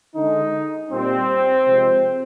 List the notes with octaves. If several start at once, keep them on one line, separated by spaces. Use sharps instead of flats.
D3 G#3 D#4
A#2 G3 C4
C3 F3 G#3